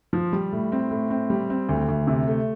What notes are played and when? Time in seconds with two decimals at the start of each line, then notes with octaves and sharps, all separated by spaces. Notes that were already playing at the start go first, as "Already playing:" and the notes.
0.13 F3
0.33 G3
0.52 A2
0.72 C4
0.91 A2
1.10 C4
1.30 G3
1.50 C4
1.69 D2
1.89 D2
2.07 C3
2.28 A3